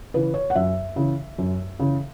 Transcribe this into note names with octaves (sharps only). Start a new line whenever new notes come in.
C#3 E3 B4
C#5
F#5
F#2 E5
C#3 E3
F#2
C#3 E3